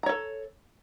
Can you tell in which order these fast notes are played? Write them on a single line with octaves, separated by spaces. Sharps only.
A#5 C#5 A4